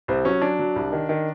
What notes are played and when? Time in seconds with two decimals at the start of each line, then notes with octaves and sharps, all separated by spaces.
0.08 C2 C4
0.25 F#3 C#4
0.42 F#3 D4
0.59 F#3
0.76 C2
0.92 D#3
1.09 D#3